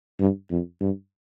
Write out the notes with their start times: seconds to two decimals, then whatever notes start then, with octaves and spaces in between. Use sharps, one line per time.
0.20 G2
0.50 F2
0.81 G2